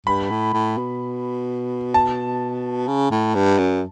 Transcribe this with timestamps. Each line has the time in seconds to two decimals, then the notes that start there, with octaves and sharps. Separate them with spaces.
0.06 G2 B5
0.30 A2
0.54 A2
0.77 B2
1.94 A5
2.88 C#3
3.11 A2
3.35 G2
3.58 F#2